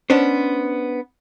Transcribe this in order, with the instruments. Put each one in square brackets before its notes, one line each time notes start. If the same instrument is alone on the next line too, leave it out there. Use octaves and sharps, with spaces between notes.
[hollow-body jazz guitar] B3 C#4 D4 C5